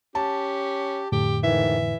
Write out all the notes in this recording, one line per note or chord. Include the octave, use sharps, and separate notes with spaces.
C#4 G4 A5
F2 A2 D3 G4
G#2 D#3 E3 E5